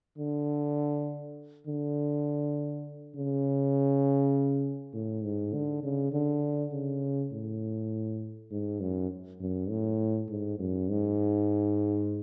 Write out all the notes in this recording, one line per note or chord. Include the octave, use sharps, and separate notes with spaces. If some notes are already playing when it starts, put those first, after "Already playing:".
D3
D3
C#3
A2
G#2
D3
C#3
D3
C#3
A2
G#2
F#2
F#2
A2
G#2
F#2
G#2